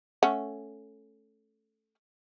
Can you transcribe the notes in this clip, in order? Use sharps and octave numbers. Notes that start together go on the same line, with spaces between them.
A3 C#4 F#5